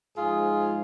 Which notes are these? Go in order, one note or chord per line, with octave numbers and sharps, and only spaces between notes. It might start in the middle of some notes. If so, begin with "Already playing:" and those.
G#2 F3 G#3 F4 G#4